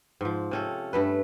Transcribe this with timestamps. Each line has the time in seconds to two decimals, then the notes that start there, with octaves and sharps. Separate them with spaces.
0.21 G#2 F3
0.51 C3 C#4 A4
0.93 G2 A3 B4